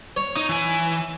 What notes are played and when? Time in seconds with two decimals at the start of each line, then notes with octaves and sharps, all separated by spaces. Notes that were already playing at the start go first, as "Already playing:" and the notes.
0.16 C#5
0.37 D#4
0.49 E3 G#5